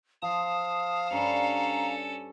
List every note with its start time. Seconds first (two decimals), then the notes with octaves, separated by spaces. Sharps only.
0.22 F3 F5 A5 D#6
1.11 G2 C#4 A4 A#5 B5 C#6